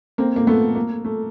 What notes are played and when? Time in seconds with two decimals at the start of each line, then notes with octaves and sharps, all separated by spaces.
0.18 A#3 C4
0.36 A#3
0.47 A3 B3
0.75 A#3
1.04 A3